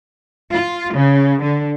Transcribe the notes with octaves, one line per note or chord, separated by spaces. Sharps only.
F4
C#3
D3